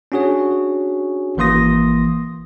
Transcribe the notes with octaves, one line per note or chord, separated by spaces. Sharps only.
C#4 D4 F#4 G#4 C#5
G#1 E3 A#3 C6 D#6 A#6